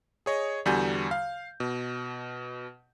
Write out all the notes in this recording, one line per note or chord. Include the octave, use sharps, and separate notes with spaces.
G#4 C#5 D#5
E2 D3 G3 F#4 G#5 G6
F5
B2